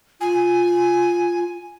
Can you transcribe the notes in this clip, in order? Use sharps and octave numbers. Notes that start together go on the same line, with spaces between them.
F4 G#5